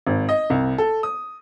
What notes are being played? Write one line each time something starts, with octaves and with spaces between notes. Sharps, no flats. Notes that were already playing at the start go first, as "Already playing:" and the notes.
G#1
D#5
C2
A4
D#6